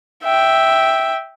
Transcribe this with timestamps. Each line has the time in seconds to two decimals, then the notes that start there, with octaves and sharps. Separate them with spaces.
0.24 E5 G5